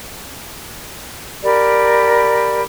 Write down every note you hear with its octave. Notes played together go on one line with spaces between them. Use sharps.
G4 A#4 D5 B5